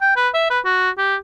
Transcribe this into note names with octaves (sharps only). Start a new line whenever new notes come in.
G5
B4
E5
B4
F#4
G4